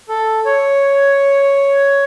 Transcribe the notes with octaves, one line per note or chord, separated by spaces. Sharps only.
A4
C#5